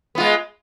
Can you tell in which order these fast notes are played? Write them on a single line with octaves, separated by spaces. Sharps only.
B3 F4 G#3